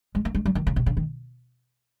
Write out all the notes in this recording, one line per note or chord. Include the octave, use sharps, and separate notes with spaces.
G#3
A#3
G#3
G3
D#3
C#3
C3
C#3
D#3